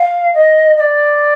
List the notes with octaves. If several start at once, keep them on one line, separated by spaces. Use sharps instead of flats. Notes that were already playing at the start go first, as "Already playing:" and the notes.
Already playing: F5
D#5
D#5
D5